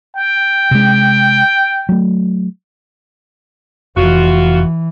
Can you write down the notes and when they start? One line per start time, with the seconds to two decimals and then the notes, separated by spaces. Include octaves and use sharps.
0.17 G5
0.71 C3 G#3
1.89 F#3 A3
3.97 F1 E3 F4 F#4